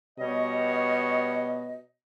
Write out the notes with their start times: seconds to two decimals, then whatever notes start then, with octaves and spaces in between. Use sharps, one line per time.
0.19 B2 G3 C#5 D#5